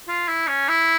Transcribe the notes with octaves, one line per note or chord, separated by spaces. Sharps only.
F4
E4
C#4
E4